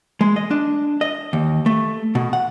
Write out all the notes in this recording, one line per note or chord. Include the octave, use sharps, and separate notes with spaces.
G#3
D#5
D4
D#5
D#2
A3
B2
F#5